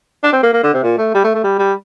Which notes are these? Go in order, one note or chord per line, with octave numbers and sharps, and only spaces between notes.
D4
C4
A#3
A#3
D3
C3
A#2
A3
G3
A3
A3
G3
G3